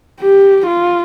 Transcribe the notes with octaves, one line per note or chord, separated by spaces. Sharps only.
G4
F4